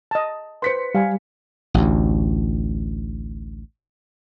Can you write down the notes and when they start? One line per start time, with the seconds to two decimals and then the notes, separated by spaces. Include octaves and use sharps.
0.11 D#5 A5
0.62 B4 C5 C6 B6 C#7
0.95 G3 F5 G#5
1.74 A1 D2